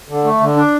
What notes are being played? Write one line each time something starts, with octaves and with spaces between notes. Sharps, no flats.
D3
A3
D3
D4